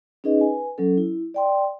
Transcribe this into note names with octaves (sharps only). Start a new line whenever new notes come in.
C#4 D#4 G#4 B4 D#5
B4 G#5
F#3 C#4 A4
E4
D5 G5 C6